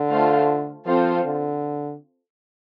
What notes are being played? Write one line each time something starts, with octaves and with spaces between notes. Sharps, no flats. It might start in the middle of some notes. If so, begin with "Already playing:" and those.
Already playing: D3
A3 F4 C5 F5 A5
F3 C4 F4 A4 C5 F5
D3